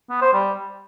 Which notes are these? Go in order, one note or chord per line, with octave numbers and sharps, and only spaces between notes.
B3
C5
G3